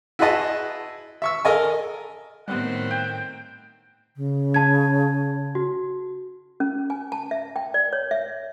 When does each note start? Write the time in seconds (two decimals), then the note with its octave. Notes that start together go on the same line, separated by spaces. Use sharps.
0.19 E4 F#4 G#4 B4 D#5 A5
1.22 E5 C#6 E6
1.45 A4 A#4 D#5 G#5
2.48 A2 D#3 G3 B3 C4 F#5
2.91 G5
4.16 C#3
4.54 A5 G#6
5.55 F#4
6.60 C#4
6.90 G#5
7.12 A5
7.31 E5
7.56 G5
7.74 D5
7.93 C#5
8.11 E5